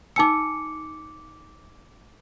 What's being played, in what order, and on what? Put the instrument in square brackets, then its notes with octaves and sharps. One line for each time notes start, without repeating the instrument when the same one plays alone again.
[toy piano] D#4 G#5 E6 [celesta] D6 C#7